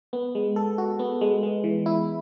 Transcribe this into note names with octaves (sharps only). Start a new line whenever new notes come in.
B3
G#3
A4
F#4
B3
G#3
G#3
E3
E4